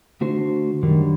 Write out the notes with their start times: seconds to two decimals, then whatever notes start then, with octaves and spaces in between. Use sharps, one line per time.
0.21 D3 A3 D4 F#4 C5
0.83 F#2 D3 D#3 G3